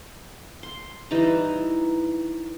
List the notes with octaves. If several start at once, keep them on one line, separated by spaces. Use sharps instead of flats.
C6
E3 G3 D#4 A#5